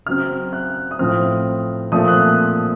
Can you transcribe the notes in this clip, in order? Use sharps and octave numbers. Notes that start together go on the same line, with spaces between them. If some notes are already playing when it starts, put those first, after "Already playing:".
C#3 F#3 C4 F6
F#6
D#6
A2 F3 C4 F6
A#2 F3 A3 C4 D#6
F#6